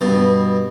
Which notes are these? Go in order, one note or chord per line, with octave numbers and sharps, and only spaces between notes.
G2 B2